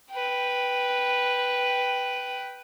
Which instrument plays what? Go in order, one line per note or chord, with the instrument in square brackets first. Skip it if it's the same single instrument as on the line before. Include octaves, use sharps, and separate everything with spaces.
[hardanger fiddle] B4 G5